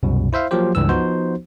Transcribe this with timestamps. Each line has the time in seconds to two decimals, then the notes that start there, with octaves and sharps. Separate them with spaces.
0.03 C2 F#2 B2
0.33 E4 C5 E5 F5
0.51 F3 F#3 A#3 F4 G4 C5
0.75 C#2 G2 E3 E6
0.89 F3 B3 D#4 F#4 C5